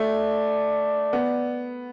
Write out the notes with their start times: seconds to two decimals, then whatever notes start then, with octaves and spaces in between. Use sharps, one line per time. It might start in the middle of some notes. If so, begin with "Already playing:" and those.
Already playing: A3 D5
1.13 B3